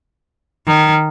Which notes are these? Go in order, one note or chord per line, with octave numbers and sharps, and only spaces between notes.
D#3